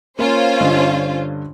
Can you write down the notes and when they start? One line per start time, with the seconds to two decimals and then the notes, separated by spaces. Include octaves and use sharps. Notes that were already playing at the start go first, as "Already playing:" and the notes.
0.19 A#3 C#4 F4 C5
0.60 G2 D3 D#5